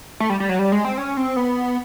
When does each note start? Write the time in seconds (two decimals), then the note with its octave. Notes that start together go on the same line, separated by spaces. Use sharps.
0.20 A3
0.30 G3
0.40 G3
0.49 F#3
0.59 G3
0.72 G#3
0.85 C4
0.98 C#4
1.17 C4
1.36 B3